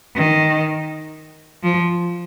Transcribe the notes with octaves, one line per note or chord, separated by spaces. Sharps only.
D#3
F3